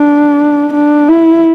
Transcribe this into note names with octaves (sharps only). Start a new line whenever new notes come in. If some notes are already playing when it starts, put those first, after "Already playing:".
Already playing: D4
D4
E4